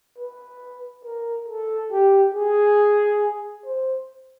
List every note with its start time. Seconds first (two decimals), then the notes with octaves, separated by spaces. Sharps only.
0.18 B4
1.05 A#4
1.48 A4
1.92 G4
2.35 G#4
3.65 C5